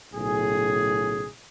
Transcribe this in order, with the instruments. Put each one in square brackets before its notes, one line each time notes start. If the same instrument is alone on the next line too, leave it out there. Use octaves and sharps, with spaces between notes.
[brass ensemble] B1 A2 C#3 G#4